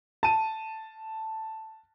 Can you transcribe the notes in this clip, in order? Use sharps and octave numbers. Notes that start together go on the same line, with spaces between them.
A5 D#7